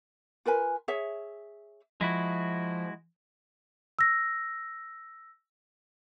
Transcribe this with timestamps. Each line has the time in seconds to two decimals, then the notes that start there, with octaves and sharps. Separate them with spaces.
0.45 F4 A#4 B4 G#5
0.88 G#4 C#5 E5
2.01 F3 G#3 E4 F#4
3.99 E6 A#6